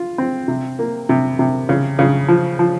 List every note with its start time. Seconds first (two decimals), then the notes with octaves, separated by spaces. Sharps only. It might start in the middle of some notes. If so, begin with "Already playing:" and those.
Already playing: F4
0.18 C4
0.48 C3
0.79 A#3
1.09 C3
1.39 C3
1.69 C#3
1.99 C#3
2.28 F3
2.59 F3